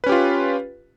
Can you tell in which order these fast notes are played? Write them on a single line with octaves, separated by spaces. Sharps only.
B4 C#4 G4 F4